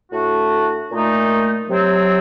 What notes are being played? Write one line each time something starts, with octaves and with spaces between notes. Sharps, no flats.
A2 A3 D4 F#4
A#2 A3 D#4
C3 F#3 C4